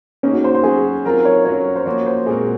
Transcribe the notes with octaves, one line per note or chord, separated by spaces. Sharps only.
D#3 A#3 C#4 D#4 G#4
F#4
C5
C5
F#3 C#4 F#4 G#4
D#3 F#3 C4 F4 A#4
C#5
F#3 C#4 F#4 C#5
C5
F3 A#3 C#4 F#4 C#5
C5
A#2 G#3 C4 F#4 G#4 A#4